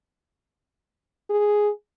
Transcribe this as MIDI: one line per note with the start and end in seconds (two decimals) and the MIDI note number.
1.30 1.70 68